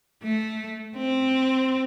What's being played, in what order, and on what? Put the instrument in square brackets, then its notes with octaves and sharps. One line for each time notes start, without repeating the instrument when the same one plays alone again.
[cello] A3
C4